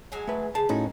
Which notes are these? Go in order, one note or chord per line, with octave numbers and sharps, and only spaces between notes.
F#3 G#3 G#5
A3 B4
C#3 A5
A2 C#4 D#4 F#4